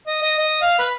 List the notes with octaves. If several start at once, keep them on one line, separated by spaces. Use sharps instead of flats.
D#5
D#5
D#5
F5
B4